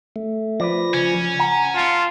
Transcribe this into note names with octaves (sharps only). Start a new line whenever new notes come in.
A3
F3 B4 C5 D5 A#6
C#3 C#4
F#5 G#5 A#5
F4 A5